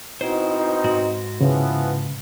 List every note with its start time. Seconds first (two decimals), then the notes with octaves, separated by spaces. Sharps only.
0.21 B2 C4 D#4 E4 C5
0.84 G#2 G#3 F#4
1.41 C#3 E3 F3 B3